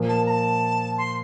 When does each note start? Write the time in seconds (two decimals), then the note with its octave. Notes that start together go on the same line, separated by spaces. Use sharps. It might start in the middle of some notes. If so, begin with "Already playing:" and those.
Already playing: A#2 F3 A#3
0.08 A5
0.26 A#5
0.30 A5
0.98 C6